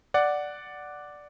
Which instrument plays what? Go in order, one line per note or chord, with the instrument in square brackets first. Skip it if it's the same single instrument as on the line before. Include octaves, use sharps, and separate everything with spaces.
[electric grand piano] D5 F#5